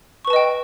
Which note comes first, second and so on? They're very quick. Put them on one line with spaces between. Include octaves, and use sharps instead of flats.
C#6 B4 A5 D#5 G5